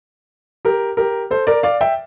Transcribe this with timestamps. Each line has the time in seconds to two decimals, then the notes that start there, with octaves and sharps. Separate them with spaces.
0.65 G4 A#4
0.97 G4 A#4
1.31 A4 C5
1.47 A#4 D5
1.63 D5 F5
1.81 E5 G5